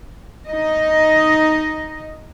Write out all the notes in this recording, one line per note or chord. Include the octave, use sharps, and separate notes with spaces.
D#4 D#5